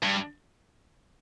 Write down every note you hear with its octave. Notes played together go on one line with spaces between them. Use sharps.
G2